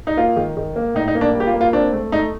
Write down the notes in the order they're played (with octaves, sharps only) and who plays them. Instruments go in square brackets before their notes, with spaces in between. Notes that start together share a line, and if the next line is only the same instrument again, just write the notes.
[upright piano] D#4
A#3 F4
D#3
D#3
A#3
A2 D#4
D#4
A#3
D4
G3
G4
F4
A#3
F4
C4 D4
A3
A3 D#4